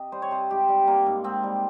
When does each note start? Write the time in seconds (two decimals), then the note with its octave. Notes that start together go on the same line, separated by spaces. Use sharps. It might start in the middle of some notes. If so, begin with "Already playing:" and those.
Already playing: C3 D#5
0.12 G3 C5
0.22 C#5
0.31 C3 C5
0.50 G#2 G4
0.69 G3
0.87 G3 A#3
1.06 G#2
1.24 G#2 C4
1.43 G3